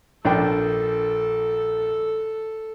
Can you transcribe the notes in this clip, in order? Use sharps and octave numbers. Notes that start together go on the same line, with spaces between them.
A#1 D4 A4 G5